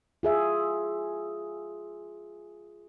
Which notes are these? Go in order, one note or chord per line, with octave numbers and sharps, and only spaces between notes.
F4 G#4 E5